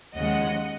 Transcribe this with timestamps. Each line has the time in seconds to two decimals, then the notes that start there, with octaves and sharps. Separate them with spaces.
0.15 D#2 C#3 F3 G#3 D#5 F#5